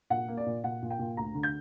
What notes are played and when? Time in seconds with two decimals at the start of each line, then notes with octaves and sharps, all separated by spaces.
0.10 A#2 F#5
0.28 A#3
0.37 D5
0.46 A#2
0.64 A#2 F#5
0.82 A#2
0.90 G5
0.99 A#2
1.17 D2 A#5
1.35 D3
1.43 G6